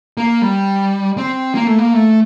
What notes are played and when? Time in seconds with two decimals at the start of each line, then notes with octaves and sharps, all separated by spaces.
0.17 A#3
0.42 G3
1.18 C4
1.55 A#3
1.67 A3
1.78 A#3
1.93 A3